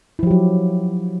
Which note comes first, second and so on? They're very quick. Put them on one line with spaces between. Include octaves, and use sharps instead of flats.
E4 F3 G4 F#3